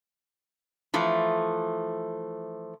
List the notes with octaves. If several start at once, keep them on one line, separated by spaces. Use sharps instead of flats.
E3 F3 A3